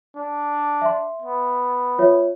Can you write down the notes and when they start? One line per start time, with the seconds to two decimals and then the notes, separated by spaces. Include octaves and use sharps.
0.16 D4
0.82 E5 C6
1.22 B3
1.98 F4 C#5 E5